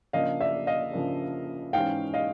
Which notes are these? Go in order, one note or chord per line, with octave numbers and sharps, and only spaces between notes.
C#3 F3 A#3 D4 D#5 F5
D5 E5
D#5 F5
C#3 F3 A#3 D4
G#2 E3 G#3 C#4 F5 G5
D#5 F5